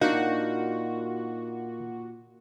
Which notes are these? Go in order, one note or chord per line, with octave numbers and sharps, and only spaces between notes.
A#2 D4 D#4 F#4 A#4 F5 F#6